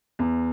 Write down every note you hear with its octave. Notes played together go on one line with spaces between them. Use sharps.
E2